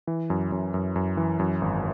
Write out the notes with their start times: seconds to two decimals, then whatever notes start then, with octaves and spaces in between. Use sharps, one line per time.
0.07 E3
0.30 F#2
0.52 F#2
0.74 F#2
0.96 F#2
1.17 E3
1.39 F#2
1.61 G#1